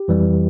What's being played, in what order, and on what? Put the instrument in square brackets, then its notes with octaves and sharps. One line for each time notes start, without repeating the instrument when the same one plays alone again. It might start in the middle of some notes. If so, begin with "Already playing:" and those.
Already playing: [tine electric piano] G4
F2 E3 G3